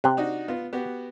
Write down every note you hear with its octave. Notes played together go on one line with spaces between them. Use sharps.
C3 C4 F#6
D4 D#4 F#4
B3 F4
B3 F#4 G4